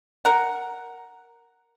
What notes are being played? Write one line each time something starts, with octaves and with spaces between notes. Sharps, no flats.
A#4 F#5